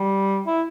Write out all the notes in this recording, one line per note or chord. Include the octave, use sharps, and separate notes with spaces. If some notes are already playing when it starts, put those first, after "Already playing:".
Already playing: G3
E4